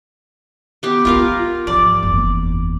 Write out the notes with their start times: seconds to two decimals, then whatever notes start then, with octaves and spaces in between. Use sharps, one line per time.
0.83 B3 G4
1.05 B3 D#4 F4 A#4 F5
1.67 G#1 F3 D5
2.02 F#1 E2